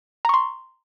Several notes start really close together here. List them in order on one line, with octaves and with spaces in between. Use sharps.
A#5 C#6 C6